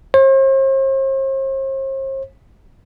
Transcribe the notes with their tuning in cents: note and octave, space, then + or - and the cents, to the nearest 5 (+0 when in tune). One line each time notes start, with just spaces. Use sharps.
C5 +45